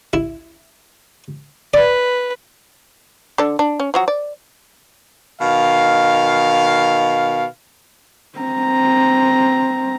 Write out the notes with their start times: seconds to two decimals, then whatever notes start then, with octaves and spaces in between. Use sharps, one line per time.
0.13 E4
1.74 B4 D5
3.38 D3 A4 D5
3.59 D4
3.80 C#4
3.94 F3 F#3 F#4
4.08 D5
5.39 B2 D#3 F5
8.39 C4 A#5